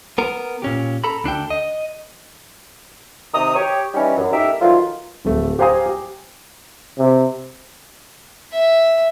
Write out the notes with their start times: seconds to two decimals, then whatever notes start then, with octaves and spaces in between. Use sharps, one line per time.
0.18 B3 A#4
0.62 A#2 C#4 G4
1.04 A4 A#5 B5
1.24 D2 D4 A4 G5
1.50 D#5
3.34 C3 D#3 A#5 D#6
3.55 G4 C#5
3.94 E3 G3 C#4 D#4
4.17 F#2
4.33 A3 D#4 G4 A#4 E5
4.61 D#3 E3 F#3 A3 F4
5.25 D1 A3
5.59 G4 C5 F5 G#5 A#5 D#6
5.86 G4
6.98 C3
8.52 E5